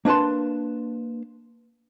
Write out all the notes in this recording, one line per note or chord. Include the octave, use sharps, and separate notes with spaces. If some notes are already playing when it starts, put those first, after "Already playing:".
A#3 D4 B4 A5 C6